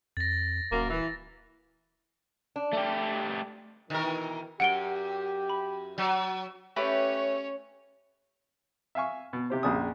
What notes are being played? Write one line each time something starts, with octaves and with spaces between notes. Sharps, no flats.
F2 A6 A#6
D#1 F#2 A#3
E3
D4
A3 G4
B2 D#3 E3 A#4
F#2 G4 F#5 D7 G7
B5
F#3
A3 C#4 G4 B4 C#5
E5 F5 G#5 C#6
B2
C3 G4 C5
A#1 F2 C#3 D4 G#5 D#6